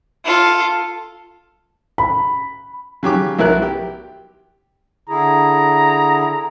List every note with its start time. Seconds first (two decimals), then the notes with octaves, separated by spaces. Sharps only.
0.25 F4 A4
1.98 B5
3.03 C#3 F#3 G4 D6
3.39 B1 E4 A#4 F#6
3.62 G4
5.09 D3 E4 G#4 A#5